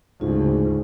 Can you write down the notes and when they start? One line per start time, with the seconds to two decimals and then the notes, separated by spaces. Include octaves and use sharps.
0.21 D2 G#2 C#3 F4